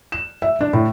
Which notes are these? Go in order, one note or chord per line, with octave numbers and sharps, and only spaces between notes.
E7
E5
D4
A2